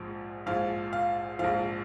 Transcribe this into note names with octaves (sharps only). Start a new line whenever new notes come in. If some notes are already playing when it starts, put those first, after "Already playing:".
Already playing: A#1 G#2 F3
A#1 G#2 F3 F5
F5
A#1 G#2 F3 F5